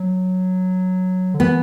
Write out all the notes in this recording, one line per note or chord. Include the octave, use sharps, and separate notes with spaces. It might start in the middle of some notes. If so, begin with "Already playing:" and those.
Already playing: F#3
D3
E3 B3